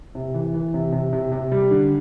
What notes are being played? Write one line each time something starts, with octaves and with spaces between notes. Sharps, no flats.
C3
E3
E3
C3
C3
C3
C3
G3
D3